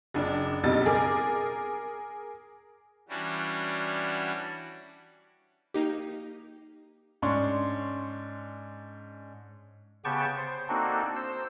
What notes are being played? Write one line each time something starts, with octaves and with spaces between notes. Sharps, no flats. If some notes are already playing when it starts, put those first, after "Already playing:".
F#1 D4
F#1 B1 F2 G3 D#4 A6
G#4 A#4 D6
E3 G3 C#4 D4 F#4
A#3 D#4 G4
G#2 C#4 D4 C6 C#6
C#3 B3 G4 G5 A5 C#6
C5
A#3 C4 D4 D#4 F#4 A4
C5 E6